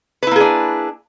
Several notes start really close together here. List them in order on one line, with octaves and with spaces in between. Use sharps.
B4 E4 A#3 G#4 D4